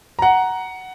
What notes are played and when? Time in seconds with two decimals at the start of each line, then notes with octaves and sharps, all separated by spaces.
0.19 F#5 A#5